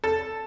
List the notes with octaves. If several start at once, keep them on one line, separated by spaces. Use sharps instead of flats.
A4